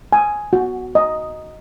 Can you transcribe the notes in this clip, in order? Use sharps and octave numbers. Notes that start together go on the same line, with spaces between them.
G#5
F#4
D#5